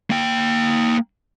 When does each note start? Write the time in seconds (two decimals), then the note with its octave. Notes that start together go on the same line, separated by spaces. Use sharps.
0.10 A#3 G5